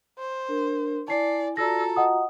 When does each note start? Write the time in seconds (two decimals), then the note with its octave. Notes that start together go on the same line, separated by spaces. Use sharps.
0.19 C5
0.48 D4 A#4
1.08 E4 D5 G#5 A5 C7
1.57 F4 F#4 A4 D5 A#5 E6 A#6
1.96 D#5 F#5 D#6